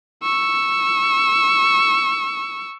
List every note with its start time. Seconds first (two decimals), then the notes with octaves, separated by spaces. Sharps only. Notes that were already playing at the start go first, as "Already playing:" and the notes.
0.23 C#6 E6